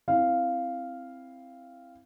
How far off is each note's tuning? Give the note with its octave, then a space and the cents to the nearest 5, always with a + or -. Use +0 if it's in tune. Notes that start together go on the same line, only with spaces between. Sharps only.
C4 +0 E4 +0 F5 -5